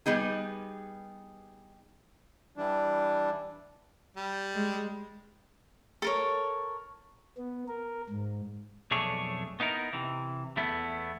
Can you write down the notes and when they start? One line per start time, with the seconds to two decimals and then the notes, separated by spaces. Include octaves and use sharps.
0.06 G3 B3 D#4 G#4
2.57 E3 G3 D4
4.16 G3
4.53 G#3
6.02 A4 A#4 C#5
7.37 B3
7.68 A#4
8.10 G#2
8.91 B1 F2 A3 D4 G#4 C#5
9.60 B3 D#4 E4 A#4
9.93 C3 E3
10.57 E2 A3 B3 E4